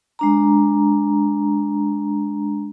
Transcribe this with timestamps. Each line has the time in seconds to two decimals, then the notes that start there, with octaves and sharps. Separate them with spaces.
0.19 G#3 D4 A#5